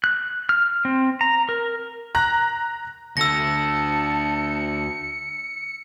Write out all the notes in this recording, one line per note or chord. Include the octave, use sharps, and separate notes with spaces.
F#6
F6
C4
A#5
A#4
A#5 F#6 A#6
D2 D3 A5 E6 A#6 C#7